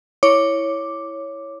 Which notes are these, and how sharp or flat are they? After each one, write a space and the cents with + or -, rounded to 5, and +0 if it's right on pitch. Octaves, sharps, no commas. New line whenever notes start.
E4 +0 C#5 +0 D6 +0